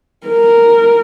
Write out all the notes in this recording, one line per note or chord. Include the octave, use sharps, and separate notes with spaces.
A#4